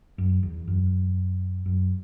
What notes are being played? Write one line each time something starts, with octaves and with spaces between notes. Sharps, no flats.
F#2
E2
F#2
F#2